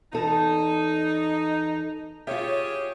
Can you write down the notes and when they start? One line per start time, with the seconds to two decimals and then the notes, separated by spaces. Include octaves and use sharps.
0.13 E2 D#4 A4
2.27 F4 G4 G#4 C#5 E5